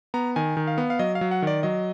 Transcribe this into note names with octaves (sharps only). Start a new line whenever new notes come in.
B3 A#5
D#3 G#5
D#3
F5
B3
F5
F#3 D#5
F5
F#3
F#5
D#3 D5
F#3 D#5